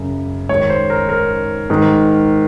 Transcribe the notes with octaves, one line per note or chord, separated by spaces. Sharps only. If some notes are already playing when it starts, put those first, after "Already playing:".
Already playing: F#2 C#3
G#2 C#5
D#3
C5
A#4
A#4
G#2 D#3